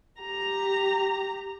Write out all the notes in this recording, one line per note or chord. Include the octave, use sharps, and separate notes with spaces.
G4 A#5